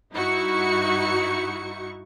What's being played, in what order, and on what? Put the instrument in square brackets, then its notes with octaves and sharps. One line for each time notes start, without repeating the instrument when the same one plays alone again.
[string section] G2 D#4 E4 F#4 C#6 C#7